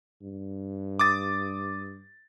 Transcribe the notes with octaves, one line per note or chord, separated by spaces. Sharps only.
G2
D6 D#6 A6